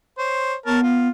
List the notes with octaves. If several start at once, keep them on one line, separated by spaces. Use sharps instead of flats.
C5 C#5
B3 A#4 C#5 A5
F4